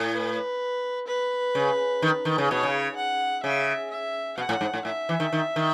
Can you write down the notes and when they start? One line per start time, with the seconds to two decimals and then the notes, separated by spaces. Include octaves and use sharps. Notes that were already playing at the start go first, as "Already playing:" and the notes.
Already playing: A2
0.14 B4
1.07 B4
1.55 C#3
2.02 D#3
2.25 D#3
2.38 C#3
2.50 B2 C#5
2.63 C#3
2.96 F#5
3.43 C#3 E5
3.90 E5
4.37 B2 F#5
4.49 A2
4.61 G#2
4.73 A2
4.85 A2 E5
5.09 E3
5.20 D#3
5.32 D#3
5.56 D#3